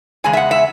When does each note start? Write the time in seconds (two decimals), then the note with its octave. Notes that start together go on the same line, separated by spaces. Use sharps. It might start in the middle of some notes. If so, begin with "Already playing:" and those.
0.24 E2 C#3 G#3 G#5
0.33 E5
0.37 F#5
0.51 E5